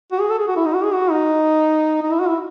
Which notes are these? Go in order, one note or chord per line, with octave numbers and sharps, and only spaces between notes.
F#4
G#4
A4
G#4
F#4
E4
D#4
F#4
G#4
F#4
D#4
D#4
E4
F#4
E4